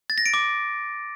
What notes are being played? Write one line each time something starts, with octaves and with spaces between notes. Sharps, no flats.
A6
A#6
D7
D6